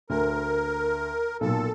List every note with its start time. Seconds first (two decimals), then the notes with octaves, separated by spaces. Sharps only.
0.10 D2 A#4
1.41 B1 A#2 A4